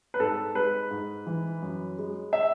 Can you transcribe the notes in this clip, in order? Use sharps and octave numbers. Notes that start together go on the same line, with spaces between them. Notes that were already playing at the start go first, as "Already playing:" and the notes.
B4
G#2 A4
G#3 B4
G#2
E3
F#2
G#3
E5